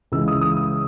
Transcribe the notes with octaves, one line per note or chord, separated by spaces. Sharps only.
C#2 C#3 E3 G#3 E6
D#6
D#6
D#6